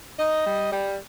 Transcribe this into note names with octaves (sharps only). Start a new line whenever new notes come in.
D#4 D#5
G3
G3